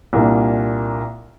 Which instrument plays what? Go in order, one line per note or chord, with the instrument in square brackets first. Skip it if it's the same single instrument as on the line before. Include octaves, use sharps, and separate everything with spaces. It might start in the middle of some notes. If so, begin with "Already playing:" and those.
[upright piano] C2 A#2 A#3 D4